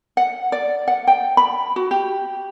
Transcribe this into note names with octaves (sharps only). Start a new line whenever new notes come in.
F#5
D5
F#5
G5
B5
F#4
G4